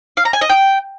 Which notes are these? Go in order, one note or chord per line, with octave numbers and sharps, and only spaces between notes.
F5
A#5
G#5
D#5
G5